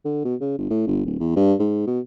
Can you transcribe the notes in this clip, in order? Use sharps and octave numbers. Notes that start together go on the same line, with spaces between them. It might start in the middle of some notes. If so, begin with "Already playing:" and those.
D3
B2
C#3
G1
A2
G1
D1
E2
G2
G#2
B2